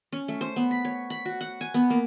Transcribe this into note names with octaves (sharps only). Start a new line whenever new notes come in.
C#4
A3
C5
B3
B5
C#5
B5
F#4
F#5
G#5
B3
A#3